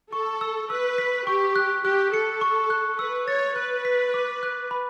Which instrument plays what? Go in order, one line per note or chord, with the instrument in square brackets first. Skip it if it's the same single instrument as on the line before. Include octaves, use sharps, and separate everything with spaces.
[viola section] A4 [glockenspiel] C#6
[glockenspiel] E6
[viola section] B4 [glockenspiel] E6
[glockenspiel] B6
[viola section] G4 [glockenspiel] C#6
[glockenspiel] F#6
[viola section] G4 [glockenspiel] F#6
[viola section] A4 [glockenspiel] C#7
[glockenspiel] C#6
F#6
[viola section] B4 [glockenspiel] E6
[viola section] C#5 [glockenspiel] A6
[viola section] B4 [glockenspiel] F#6
[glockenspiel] B6
D6
F#6
B5